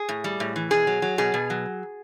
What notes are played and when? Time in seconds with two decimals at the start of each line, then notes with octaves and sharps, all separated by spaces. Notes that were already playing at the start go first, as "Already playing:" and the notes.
Already playing: G#4
0.09 A2
0.24 G3
0.40 A2
0.56 E3
0.71 B2 G#4
0.87 F#3
1.02 F#3
1.18 B2 G#4
1.34 B2
1.50 F#3